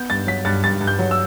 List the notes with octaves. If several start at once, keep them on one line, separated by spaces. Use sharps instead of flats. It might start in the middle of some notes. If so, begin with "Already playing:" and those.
Already playing: B3 G6
G2 A6
F#3 B6
G2 A6
G2 A6
G2
G6
F#3
E6